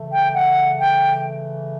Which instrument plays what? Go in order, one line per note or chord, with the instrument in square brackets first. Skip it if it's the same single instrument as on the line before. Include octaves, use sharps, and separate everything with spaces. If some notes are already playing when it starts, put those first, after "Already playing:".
Already playing: [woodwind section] C#3 E3 A3
G5
F#5
G5